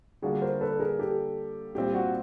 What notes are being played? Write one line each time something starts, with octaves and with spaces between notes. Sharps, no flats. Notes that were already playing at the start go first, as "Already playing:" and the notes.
D3 G3 A#3 D4 F4 F#4 G#4
A#4 C5
A4 B4
G#4 A#4
G4 A4
A#2 G3 C4 F4 G4
F#4